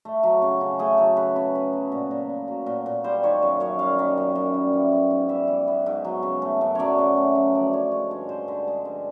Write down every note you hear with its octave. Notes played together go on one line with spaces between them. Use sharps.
A3
F#3
C#3
C#3
A3 G#4
F#3 A4
C#3 B4
C#3 B4
B3 B4
F#3
A#2
A#2
B3
F#3
A#2
A#2
G3 C5
D#3 C#5
F#2
F#2 C#5
G3 F5
D#3
F#2
F#2
G3
E3
B3
G#2
G3 E5
E3
B3
G#2
F#3
C#3
A3
F#2
F#3 C#5 D5
C#3
A3
F#2
F3 D5
D3 C#5
G#3
G2 C#5
F3 C5
D3
G#3
G2